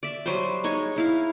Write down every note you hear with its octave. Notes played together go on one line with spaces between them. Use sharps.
D5 E5
F#3 G3 B4 C5
G#3 D#4 C#5 C#6
D#4 E4 F5